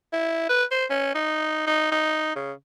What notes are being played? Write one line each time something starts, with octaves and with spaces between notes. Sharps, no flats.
E4
B4
C5
C#4
D#4
D#4
D#4
C#3